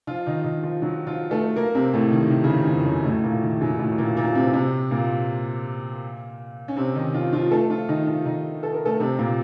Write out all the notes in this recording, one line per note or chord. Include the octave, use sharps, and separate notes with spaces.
F3 F4
D#3 D#4
D#3 D#4
F3 F4
F#3 F#4
F3 F4
A3 A4
A#3 A#4
C3 C4
A2 A3
D#3
D#3
C#3
D#3
D#3
F2 F3
F#2 F#3
A2 A3
A#2 A#3
D#3
F#2 F#3
A2 A3
A#2 A#3
A#2 A#3
C3 C4
C3 C4
A#2 A#3
C#4
C3 C4
D#3 D#4
F3 F4
F3 F4
A3 A4
F3 F4
D#3 D#4
F3 F4
D#3 D#4
A4
A#4
A3 A4
C3 C4
A#2 A#3